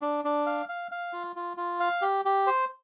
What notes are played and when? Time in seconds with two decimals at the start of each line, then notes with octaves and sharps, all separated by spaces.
0.02 D4
0.25 D4
0.46 F5
0.69 F5
0.92 F5
1.13 F4
1.36 F4
1.57 F4
1.80 F5
2.02 G4
2.25 G4
2.47 C5